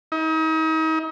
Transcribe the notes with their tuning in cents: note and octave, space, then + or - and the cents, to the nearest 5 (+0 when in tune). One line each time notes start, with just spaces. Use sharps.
D#4 +40